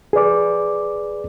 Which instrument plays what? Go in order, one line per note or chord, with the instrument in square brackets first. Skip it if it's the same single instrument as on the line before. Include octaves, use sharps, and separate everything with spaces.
[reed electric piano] G#4 B4 D5 D6